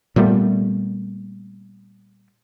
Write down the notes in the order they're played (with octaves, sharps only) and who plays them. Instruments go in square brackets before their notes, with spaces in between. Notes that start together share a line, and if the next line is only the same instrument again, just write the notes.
[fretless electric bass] A#2 G3 A3 B3